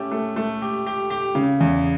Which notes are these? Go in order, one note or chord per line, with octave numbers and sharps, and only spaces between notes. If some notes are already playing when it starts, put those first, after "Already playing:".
Already playing: A3 C#4 G4
A3
A3
G4
G4
G4
C#3
E2